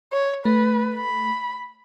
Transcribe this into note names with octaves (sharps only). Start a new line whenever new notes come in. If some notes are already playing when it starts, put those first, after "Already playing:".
C#5
A3 B4
B5